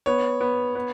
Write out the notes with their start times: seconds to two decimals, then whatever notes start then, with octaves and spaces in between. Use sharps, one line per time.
0.06 B3 C#5
0.40 B3
0.75 B3